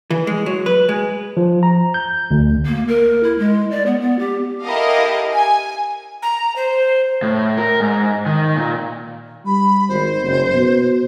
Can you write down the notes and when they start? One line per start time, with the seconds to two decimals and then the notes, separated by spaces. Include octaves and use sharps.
0.10 E3
0.27 G#3
0.46 F#3
0.66 B4
0.89 G#3
1.37 F3
1.63 A#5
1.94 G6
2.31 D2
2.66 A#3
2.88 A#4
3.23 E4
3.39 G#3
3.71 D5
3.86 B3
4.00 B3
4.19 G4
4.63 E4 G4 A4 A#4 D#5 F5
5.33 G#5
6.23 A#5
6.56 C5
7.22 A2
7.57 A#4
7.80 G#2
8.26 D#3
8.57 A#2
9.46 G3 B5
9.88 G#1 C5
10.23 F#1
10.54 B2